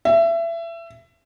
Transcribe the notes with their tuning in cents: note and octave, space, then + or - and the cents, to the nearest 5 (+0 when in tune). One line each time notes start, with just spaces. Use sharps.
E5 +25